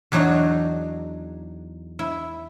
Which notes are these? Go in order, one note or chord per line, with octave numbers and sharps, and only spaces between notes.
E2 F#3 D4 D#4 F#4 G#4
E4